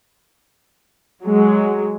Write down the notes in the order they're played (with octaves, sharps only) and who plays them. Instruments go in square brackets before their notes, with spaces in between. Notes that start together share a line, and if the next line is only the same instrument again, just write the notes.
[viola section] F#3 G#3